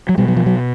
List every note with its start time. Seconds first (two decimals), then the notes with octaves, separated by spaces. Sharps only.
0.09 F#3
0.18 B2 G3
0.28 F#3
0.37 F3
0.46 F#3